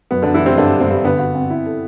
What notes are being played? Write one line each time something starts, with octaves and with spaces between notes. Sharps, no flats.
F#2 B3
F#2 D3 D4
E3 E4
F#2 C3 C4
G2 D3 D4
G2
C3 C4
G2
D3 B3
F#4
C4
E4
A4